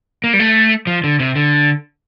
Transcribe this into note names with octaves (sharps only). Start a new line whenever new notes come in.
A#3
G3
A3
F3
D3
C3
D3